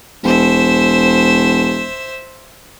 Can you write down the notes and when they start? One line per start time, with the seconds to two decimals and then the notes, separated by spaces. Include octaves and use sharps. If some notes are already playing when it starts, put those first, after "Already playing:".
0.24 E1 C5 E5